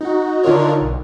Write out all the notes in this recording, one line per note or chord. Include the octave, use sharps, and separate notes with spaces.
D#4 F#4
D3 D4 D#4 F4 A#4 C#5
B1